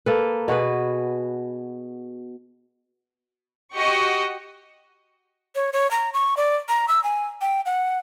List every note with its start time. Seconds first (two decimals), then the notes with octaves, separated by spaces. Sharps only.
0.06 A#3 A4 B4
0.48 B2 F#4 G#4 B4
3.74 F#4 G4 D#5 C#6
5.56 C#5
5.73 C#5
5.91 A#5
6.14 C#6
6.37 D5
6.69 A#5
6.88 E6
7.04 G#5
7.41 G5
7.66 F#5